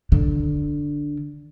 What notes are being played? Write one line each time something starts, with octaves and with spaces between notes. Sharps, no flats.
D3